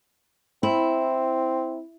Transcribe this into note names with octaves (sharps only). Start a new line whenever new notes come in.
C4 E4